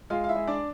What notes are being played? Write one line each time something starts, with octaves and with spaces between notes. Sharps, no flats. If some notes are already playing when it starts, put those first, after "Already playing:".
G#3 F4 F5
F5
E4 E5
G#3
D4 D5